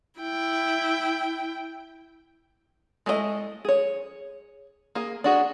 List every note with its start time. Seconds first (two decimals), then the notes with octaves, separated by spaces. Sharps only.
0.20 E4 G5
3.06 G#3 A3 E4 G#4 D#5
3.65 G#4 C#5
4.95 A#3 G#4
5.24 D4 F#4 G#4